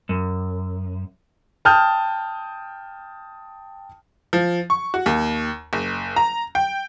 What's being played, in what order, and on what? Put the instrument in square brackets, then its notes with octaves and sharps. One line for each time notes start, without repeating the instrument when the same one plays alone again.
[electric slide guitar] F#2
[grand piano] G5 A5 D#6 F6 G6
[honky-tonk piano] F3
C#6
F#4
D#2
F#1
A#5
G5